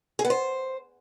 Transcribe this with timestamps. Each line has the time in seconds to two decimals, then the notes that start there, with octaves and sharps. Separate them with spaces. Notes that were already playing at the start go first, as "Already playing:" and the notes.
0.19 G#4
0.25 B3
0.30 C5